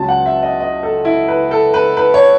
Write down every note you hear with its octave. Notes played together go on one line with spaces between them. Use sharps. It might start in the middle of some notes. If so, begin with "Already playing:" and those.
Already playing: C#2 C#3 F#3 A5
F#5
E5
D#5
D#5
A4
E4
B4
A4
B4
B4
C#5